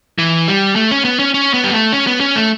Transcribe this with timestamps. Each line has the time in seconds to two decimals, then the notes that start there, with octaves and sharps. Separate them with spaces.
0.18 E3
0.48 G3
0.76 A3
0.91 C#4
1.05 B3
1.19 C#4
1.34 C#4
1.54 B3
1.64 G3
1.72 A3
1.92 C#4
2.07 B3
2.20 C#4
2.36 A3